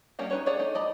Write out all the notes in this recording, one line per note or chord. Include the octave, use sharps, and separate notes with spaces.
G3 A#3 C#4 F#5
D#4 B4 C#5
G#4 C#5 D5 F#5
A3 D#4
D5 D#5 B5